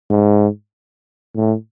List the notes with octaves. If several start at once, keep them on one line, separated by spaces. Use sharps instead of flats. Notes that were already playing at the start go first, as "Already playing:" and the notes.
G#2
A2